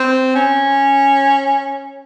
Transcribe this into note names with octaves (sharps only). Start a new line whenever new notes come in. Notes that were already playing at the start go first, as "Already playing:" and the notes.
Already playing: C4
C#4